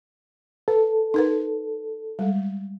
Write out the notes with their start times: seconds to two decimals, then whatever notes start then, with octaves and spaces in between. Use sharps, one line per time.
0.68 A4 B4
1.14 D#4 A#4 B4
2.19 G3 G#3